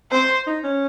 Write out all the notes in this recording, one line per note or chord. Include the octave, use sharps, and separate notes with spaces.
C4 C5
D#4
C#4